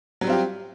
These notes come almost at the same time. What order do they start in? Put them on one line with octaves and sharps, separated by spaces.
F#3 G3 C4 F4 G4